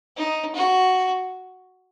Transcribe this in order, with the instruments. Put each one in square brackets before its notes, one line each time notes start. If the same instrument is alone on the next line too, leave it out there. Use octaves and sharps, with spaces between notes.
[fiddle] D#4
F#4